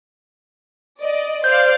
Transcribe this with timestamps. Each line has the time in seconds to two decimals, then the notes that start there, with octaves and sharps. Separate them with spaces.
1.00 D5 D#5
1.44 C5 D5 F5 G6